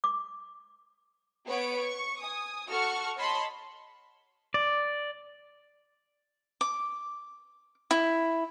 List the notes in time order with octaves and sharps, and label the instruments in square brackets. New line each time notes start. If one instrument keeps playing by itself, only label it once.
[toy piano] D6
[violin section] B3 B4 C#5 F#5 D7
C#6
G#5 D#6
F#4 A4 F#5 C#6 F6
C#5 D#5 A5 B5 C6
[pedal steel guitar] D5
[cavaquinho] D6
E4